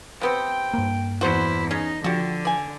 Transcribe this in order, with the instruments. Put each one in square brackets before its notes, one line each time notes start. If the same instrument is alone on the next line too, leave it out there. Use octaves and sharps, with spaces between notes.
[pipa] C3 B3 C4 [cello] G5
[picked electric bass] G2 A#3
[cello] E2 E4 [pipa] F#4 C5
[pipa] C#4 G#4 [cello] D#4
[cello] D3 [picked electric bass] F3 [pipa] F#4 G4
[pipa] D5 G#5